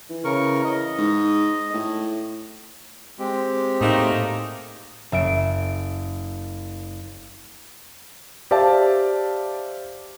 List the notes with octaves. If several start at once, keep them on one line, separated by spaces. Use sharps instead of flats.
E3
C#3 A#4 C#6
D#5
G#2
A2
G#3 C4 G4
A2 A3 A#3 D#4
F#1 E5 D7
G4 C5 D5 E5 F5 A5